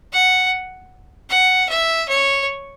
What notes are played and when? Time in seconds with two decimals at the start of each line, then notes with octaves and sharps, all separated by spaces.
0.13 F#5
1.30 F#5
1.69 E5
2.09 C#5